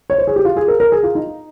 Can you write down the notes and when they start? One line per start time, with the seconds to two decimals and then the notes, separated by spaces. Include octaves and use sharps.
0.10 C#5
0.18 C5
0.27 G#4
0.36 G4
0.45 F4
0.57 G#4
0.68 A#4
0.80 A#4
0.92 G#4
1.03 F4
1.15 D#4